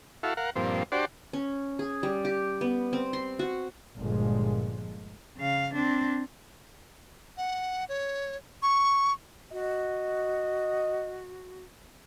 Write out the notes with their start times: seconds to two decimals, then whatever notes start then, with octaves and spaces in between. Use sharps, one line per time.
0.23 E4 F#4 A4 F5
0.37 A#4 F5 F#5
0.56 G2 A#2 F3 C4
0.92 D4 F#4 G4 C5 D5
1.33 C#4
1.79 G#4
2.03 G3
2.25 G4
2.61 B3
2.93 C4
3.13 C6
3.39 F#4
3.96 G1 A#2 F3 G#3
5.37 C#3 F5
5.75 C4 D4
7.37 F#5
7.89 C#5
8.62 C#6
9.52 F#4 D#5